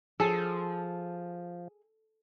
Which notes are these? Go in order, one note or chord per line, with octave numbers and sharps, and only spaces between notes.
F3 G#4 A4